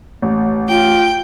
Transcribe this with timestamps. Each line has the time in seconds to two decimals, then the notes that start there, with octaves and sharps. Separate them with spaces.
0.22 A1
0.69 F4 G5